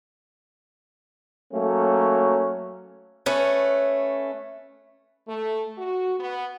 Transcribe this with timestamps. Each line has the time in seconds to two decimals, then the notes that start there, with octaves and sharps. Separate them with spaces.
1.53 F#3 A3 A#3 C#4
3.26 A3 C#4 B4
5.28 A3
5.78 F#4
6.20 B3